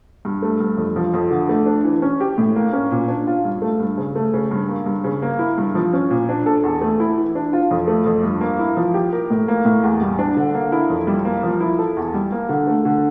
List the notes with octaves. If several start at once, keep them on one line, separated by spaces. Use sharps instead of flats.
G2
A3
G2
F2
F3
F2
D3
A3
D4
E3
C#4
G4
A2
A#3
C#4
A#2
D4
F4
G2
A3
G2
C#3
A3
C#3
G2
A#3
G2
C#3
A#3
E4
G2
F3
C#4
A#2
D4
A4
E2
A3
E4
E3
D4
F4
F2
A3
F2
G2
A#3
E4
F3
G4
A#4
A2
A#3
A2
E2
G3
D4
D3
A#3
E4
F2
G3
A#3
F3
E4
A4
E2
G3
A#3
D3
A3
D3